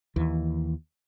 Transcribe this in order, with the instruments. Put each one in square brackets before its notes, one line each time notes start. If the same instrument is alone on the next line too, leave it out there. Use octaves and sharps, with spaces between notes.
[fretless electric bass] D#2 E3